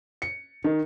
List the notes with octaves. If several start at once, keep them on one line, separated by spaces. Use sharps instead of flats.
C#7
D#3